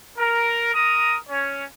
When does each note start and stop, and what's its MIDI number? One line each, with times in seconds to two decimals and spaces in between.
0.17 0.72 70
0.74 1.17 70
0.74 1.17 82
0.74 1.17 87
1.28 1.64 61
1.28 1.64 73